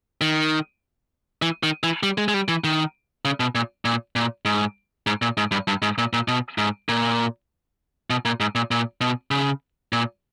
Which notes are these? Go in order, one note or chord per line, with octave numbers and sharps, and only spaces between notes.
D#3
E3
D#3
E3
G3
G#3
G#3
G3
E3
D#3
C#3
B2
A#2
A#2
A#2
G#2
G#2
A#2
G#2
G2
G2
G#2
A#2
A#2
B2
G#2
A#2
B2
A#2
G#2
A#2
A#2
B2
C#3
A#2